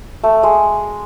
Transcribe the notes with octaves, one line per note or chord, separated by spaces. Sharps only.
A3
G#3